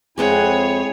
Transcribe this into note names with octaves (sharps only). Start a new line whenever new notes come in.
F2 G#3 C4 E4 G#4 C#5 F#5